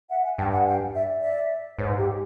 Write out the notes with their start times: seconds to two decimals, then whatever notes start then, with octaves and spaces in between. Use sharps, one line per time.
0.11 E5 F#5
0.24 F#5 G#5
0.38 G2 G5 A5
0.52 F#5 G#5
0.66 F5 G5
0.94 D5 E5
1.22 D5 E5
1.78 G#2 B4 C#5
1.97 G4